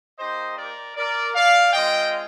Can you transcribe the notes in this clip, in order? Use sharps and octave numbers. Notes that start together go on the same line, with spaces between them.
A#3 D#4 G4 C5 D#5
A#4 D5
A#4 D5
D5 F5
G#3 C4 F4 D#5 G5